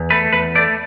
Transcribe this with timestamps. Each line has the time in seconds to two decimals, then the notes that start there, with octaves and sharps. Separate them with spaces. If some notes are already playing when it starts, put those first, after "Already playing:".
Already playing: E2
0.10 A3 B4
0.33 E2 B4
0.55 A3 D5